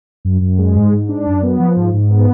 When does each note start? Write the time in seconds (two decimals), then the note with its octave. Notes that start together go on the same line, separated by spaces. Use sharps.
0.25 F#2
0.41 F#2
0.58 G#3
0.75 G#2
0.93 G#2
1.09 D4
1.26 F#2
1.43 B3
1.59 F3
1.76 G#2
1.93 G#2
2.10 B3